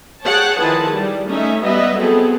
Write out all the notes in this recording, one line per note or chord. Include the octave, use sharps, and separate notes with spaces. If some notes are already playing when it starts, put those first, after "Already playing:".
G#4 C#5 F#5 G5 A5
D#3 F3 E4 G#4 B4 A5
G3
A3 C#4 D#4 E5
G3 B3 B4 D#5 E5
F#3 B3 C4 G#4 A4